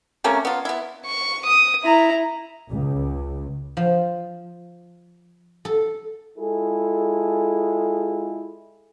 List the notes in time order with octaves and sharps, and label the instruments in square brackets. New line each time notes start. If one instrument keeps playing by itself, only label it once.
[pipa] C3 A3 A#3 C#4
B3 F4
B3 E4
[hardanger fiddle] C#6
D#6
E4 A#5
[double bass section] C#2
[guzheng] F3
A4
[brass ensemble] G#3 E4 F4 G#4 A4